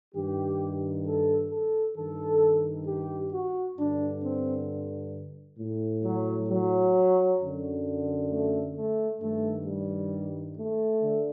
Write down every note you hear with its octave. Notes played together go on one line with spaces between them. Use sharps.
G2 D#3 G4
A4
A4
G2 D#3 A4
G4
F#4
G2 D3 D4
C4
A2
F#3
F#3
F#2 D3
A3
A3
G2 D#3 A3
G3
A3
D3